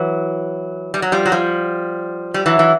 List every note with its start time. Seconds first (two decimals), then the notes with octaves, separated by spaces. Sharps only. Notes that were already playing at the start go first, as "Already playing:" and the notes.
Already playing: E3 F#3
0.94 G3
1.02 F#3
1.12 F3 G3
1.26 F#3
1.32 F3 G3
2.34 G3
2.46 E3 F#3
2.59 E3